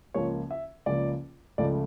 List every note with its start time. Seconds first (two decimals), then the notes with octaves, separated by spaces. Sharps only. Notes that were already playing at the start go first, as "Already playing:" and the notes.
0.14 C#2 C#3 F3 A#3 C#5
0.51 E5
0.86 C#2 C#3 F3 A#3 D5
1.58 C#2 C#3 F3 A3 D5